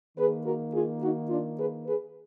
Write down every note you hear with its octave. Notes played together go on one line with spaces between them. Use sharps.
D#3 A#3 G#4 B4
F#4 A#4
F4 G#4
D#4 F#4
D4 F4
G#4 B4
G#4 B4